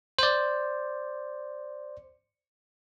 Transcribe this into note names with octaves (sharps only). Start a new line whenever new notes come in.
C5 D5